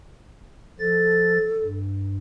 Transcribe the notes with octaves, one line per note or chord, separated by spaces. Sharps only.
F3 A4 A6
G2